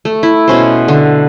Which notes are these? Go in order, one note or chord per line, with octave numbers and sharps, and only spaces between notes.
A3
E4
B2 C#4 C5
D3